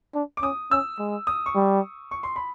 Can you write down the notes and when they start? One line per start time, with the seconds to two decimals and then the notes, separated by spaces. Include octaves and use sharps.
0.15 D4
0.37 D6
0.42 C#4 D#6
0.71 C#4 E6
0.99 G#3
1.27 D#6
1.46 C#6
1.55 G3
2.11 C#6
2.23 C6
2.36 B5